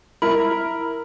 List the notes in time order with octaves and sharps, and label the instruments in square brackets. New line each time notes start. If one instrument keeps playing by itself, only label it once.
[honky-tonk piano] E4 A#4 [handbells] B5